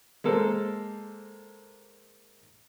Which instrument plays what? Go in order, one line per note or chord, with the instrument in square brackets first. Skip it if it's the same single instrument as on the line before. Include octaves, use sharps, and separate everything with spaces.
[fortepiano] G#3 A#3 A4 A#4 C5